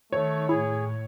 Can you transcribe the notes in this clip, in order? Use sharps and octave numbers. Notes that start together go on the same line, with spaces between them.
D#3 A3 C#5
A2 E4 G#4